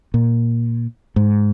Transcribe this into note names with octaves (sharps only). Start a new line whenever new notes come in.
A#2
G#2